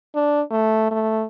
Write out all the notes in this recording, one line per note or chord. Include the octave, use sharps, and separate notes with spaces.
D4
A3
A3